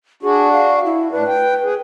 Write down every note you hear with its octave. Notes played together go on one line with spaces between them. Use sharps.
D4 F#4 G#4
F5
E4
A2 D4 B4
G5
G#4